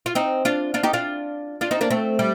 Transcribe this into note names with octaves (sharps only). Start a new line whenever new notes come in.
F4
C4 D#4
D4 F4
D4 F4
D#4 G4
D4 F4
D4 F4
C4 D#4
A#3 D4
A3 C4
G3